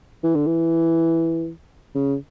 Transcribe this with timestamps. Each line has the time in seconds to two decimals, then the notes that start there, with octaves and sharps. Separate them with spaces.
0.23 E3
0.35 D3
0.47 E3
1.95 C#3